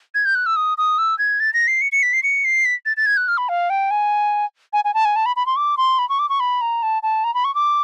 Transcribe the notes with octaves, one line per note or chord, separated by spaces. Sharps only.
G#6
G6
F#6
E6
D#6
D#6
E6
G#6
A6
A#6
C7
C#7
C#7
B6
C7
C#7
C7
B6
A6
A6
G#6
F#6
F6
B5
F5
G5
G#5
G#5
G#5
A5
G#5
A5
B5
B5
C6
D6
C6
B5
C#6
D6
C#6
B5
A#5
A5
A5
A#5
B5
C#6
D6